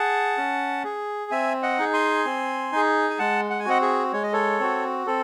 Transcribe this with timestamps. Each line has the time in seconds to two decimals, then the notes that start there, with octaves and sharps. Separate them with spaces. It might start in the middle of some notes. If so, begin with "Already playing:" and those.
Already playing: G#4 F#5 A5
0.37 C#4
0.84 G#4
1.31 C4 E5 G#5
1.62 D#5 F#5
1.78 D#4 G#4
1.93 G#5 C6
2.25 C4
2.72 D#4 G#4
3.10 G#5
3.19 G#3 F#5 A5
3.50 F#5
3.60 G#5
3.65 C4 F#4 D#5 F#5
3.82 G#4
4.13 G#3 C#5
4.23 D#5
4.33 A4 C#5
4.60 C4 F#4
5.07 C4 A4